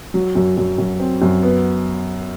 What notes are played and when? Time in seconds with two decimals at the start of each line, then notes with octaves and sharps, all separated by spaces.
0.14 F#3
0.35 F#2
0.57 F#2
0.78 F#2
0.99 C4
1.22 F#2
1.43 B3